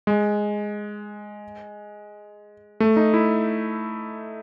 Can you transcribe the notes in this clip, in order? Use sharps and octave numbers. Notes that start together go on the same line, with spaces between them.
G#3
A3
D#4
E4